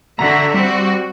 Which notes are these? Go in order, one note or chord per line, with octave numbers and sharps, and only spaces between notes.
D3 F#4 E5 A#5
G3 C4 F#4